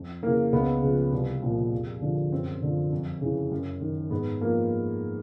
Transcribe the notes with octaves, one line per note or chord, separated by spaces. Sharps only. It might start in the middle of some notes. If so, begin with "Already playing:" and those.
Already playing: F2
C#3 E3 A#3
C#2 B3
C#3 F3
C2
A#2 F3
F2
D3 F3
F#2 C4
D3 F3
F2
C#3 E3
F#2
D#3
G#2 B3
F3 A#3